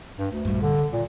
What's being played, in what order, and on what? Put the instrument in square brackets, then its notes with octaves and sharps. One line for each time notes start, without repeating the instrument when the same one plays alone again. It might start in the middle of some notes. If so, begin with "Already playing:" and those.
[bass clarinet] G2
D2
[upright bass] A#1 G2
[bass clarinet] D3
[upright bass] C3
[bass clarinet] A#2 [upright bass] D#3